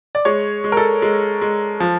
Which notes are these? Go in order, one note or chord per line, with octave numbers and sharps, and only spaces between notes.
D5
G#3 C#5
G#3
A#4
A4
G#3
G#3
F3